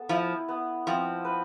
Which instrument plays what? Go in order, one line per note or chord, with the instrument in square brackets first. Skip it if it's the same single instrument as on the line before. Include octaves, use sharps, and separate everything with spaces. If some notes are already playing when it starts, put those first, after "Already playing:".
Already playing: [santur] B3 A4
[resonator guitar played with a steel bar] F3 [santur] E4
[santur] B3
[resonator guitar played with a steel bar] F3 [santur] C4
[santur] B4